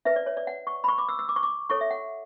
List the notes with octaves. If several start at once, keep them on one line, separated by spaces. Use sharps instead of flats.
E4 B4 E5
D5
C#5
D5
F#5
C#6
B5
C#6
D6
E6
E6
D6
C#6
D6
E4 A4 C#5 C#6
E5
F#5